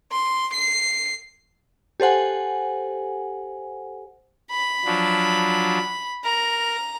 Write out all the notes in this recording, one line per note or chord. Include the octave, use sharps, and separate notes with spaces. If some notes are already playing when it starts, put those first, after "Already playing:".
C6
C7
G4 A4 C5 F#5 G#5
B5
F3 F#3 D4
A#4 A#5